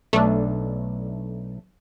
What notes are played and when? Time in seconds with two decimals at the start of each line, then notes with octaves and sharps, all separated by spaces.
0.13 B1 A3 D4